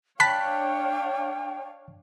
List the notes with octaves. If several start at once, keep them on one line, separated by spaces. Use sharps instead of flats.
D4 C#5 F5 G5 A5 B5 F#6 B6